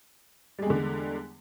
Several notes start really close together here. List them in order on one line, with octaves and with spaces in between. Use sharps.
G3 G#3 E2 D3